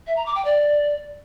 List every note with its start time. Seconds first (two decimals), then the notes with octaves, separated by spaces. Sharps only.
0.07 E5
0.16 A#5
0.26 D6
0.35 G5
0.45 D5